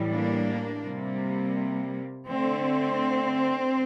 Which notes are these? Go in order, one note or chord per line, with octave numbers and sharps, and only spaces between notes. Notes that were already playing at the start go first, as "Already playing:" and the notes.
Already playing: A2 E3 G3
A#3 D4
C3 G3 A#3
D3 A3 C4